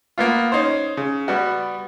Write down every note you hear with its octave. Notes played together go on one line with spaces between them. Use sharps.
A#3 B3 F4
C#4 D#4 C5
C#3
G3 B3 F#4